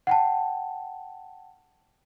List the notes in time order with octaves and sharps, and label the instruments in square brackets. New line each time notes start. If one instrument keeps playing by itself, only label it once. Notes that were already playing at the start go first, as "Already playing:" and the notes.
[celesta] F#5 G5 A5